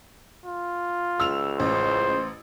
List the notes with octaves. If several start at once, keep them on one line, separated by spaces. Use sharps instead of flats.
F4
C#2 E6 F7
A1 C5